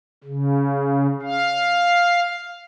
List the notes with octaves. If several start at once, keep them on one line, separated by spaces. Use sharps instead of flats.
C#3
F5